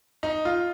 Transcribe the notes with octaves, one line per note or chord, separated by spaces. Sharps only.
D#4
F4